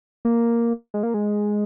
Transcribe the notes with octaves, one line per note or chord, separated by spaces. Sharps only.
A#3
G#3
A#3
G#3